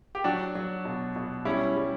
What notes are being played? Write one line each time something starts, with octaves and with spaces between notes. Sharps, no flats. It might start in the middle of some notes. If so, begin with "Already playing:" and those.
G4
F#3 D4 F#4
F#3
B2
B2
G3 C#4 E4
G3